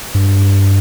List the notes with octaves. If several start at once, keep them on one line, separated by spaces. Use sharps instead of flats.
G2